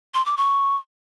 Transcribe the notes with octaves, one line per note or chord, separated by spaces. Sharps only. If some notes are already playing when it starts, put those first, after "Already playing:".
C6
D6
C#6